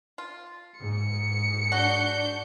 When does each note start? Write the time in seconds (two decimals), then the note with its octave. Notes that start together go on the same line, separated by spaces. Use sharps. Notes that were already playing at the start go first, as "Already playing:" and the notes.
0.18 F4
0.80 G#2 C#7
1.72 D4 F#4 G6